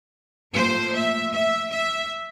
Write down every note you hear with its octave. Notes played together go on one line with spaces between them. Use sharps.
A2 F3 A#3 C5
E5
E5
E5